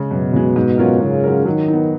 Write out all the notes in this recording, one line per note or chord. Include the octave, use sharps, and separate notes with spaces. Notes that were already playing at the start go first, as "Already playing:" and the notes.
Already playing: C#3 G#3
F#2 B2
C#3 G#3
G#2
F#3 C#4 F4 A#4
G#2 C#3
F#3 C#4 F4 A#4
D#3 F#3
B3 D#4